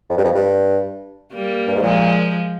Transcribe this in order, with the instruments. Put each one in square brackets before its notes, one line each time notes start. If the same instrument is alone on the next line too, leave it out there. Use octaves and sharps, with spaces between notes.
[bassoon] F2
G2
F2
G2
[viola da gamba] G3 A#3
[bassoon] G2
G#2
[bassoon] A#2 [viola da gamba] F3 G#3